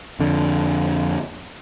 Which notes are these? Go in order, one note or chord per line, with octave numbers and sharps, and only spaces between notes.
F2 D3